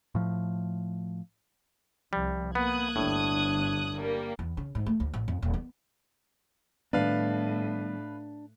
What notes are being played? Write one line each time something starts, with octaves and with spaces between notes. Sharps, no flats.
A2 F3
C2 F3 G3
A#3 B3 D#6 F#6 G#6
G1 A2 D4
G3 A#3
E2
C#3
G#2
A3
D2
A1
F2
D#1
B3
A2 D#3 G3 B3 D4 B4 F5